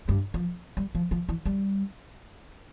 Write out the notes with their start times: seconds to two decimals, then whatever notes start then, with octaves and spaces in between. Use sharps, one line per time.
0.09 G2
0.34 F3
0.77 G3
0.95 F3
1.11 F3
1.29 E3
1.46 G3